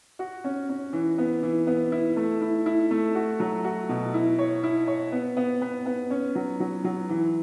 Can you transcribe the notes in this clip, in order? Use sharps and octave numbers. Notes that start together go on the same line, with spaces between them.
F#4
C#4
C#4
E3
B3
E3
B3
E4
A3
E4
E4
A3
F#4
F#3
F#4
B2
E4
C#5
E4
C#5
B3
B3
B3
B3
C#4
F#3
F#3
F#3
E3